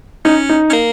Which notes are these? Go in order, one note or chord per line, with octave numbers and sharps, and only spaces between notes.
C#4 D#4
D#4
C#4
A#3